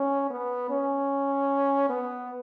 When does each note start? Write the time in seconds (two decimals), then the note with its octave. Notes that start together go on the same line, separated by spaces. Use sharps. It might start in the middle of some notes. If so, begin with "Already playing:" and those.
Already playing: C#4
0.30 B3
0.70 C#4
1.89 B3